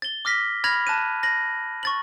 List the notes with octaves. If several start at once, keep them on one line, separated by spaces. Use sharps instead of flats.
A6 G7
D6 F6 A#6 B6
B5 F6 G#6 A#6 F7 F#7
A5 F#6 D#7
A#6 F#7
C#6 A6 F#7